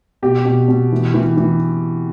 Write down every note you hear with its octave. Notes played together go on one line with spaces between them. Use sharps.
B2 G4
B2
B2
E3
E3
E3